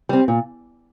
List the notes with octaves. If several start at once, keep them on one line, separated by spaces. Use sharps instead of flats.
G3 C4
A#2